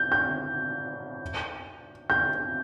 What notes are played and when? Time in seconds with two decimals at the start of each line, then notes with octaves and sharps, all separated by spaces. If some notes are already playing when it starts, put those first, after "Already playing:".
Already playing: G6
0.12 G6
2.10 G6